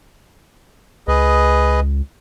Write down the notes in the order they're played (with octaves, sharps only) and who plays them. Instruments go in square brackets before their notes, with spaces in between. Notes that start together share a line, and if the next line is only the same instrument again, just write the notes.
[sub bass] C#2 [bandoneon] G#4 B4 D#5